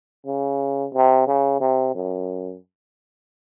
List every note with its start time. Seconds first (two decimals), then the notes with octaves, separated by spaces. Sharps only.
0.26 C#3
0.93 C3
1.27 C#3
1.60 C3
1.95 F#2